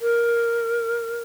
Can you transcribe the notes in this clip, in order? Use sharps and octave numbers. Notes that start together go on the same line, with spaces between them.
A#4